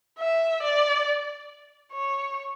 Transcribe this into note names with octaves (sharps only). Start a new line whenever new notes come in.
E5
D5
C#5